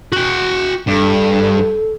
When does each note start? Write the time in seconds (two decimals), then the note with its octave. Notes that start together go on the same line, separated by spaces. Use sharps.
0.13 F#4 G5
0.88 G2 A4